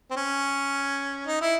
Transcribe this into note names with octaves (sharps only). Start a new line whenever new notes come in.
C4
C#4
D#4
E4